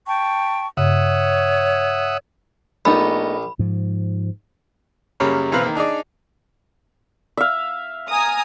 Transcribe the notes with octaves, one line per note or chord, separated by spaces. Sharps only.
G5 A5 C#6
G2 C#3 C#5 E5 F#5 D#6
A#1 A3 B3 D#4 B5
G#2 F3
F#2 C#3 G3 A#3 C#5 B5
B1 E3 C4 B4 F5 A#5
D#3 A#3
D4 D#4 G#4 D5
E5 F5
G#5 A#5 D#6